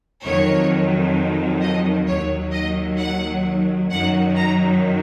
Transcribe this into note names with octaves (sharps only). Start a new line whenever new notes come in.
F2 D#3 F#3 C#5
D#5
D#2 D#3 F#3 C#5
D#5
F#5
F#2 D#3 F#3 F#5
A#5